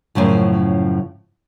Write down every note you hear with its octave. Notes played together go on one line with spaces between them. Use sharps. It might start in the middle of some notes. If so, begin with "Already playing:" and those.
F#2 A2 C#3 F3